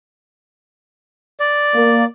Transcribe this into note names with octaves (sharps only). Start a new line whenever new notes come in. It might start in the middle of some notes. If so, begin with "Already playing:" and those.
D5
A#3